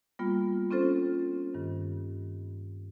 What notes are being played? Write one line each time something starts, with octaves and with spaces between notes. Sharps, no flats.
G3 A#3 B3 F4
C4 C#4 F4 A4 C5
G2 D#3